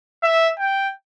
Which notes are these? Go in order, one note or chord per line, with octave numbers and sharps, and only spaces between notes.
E5
G5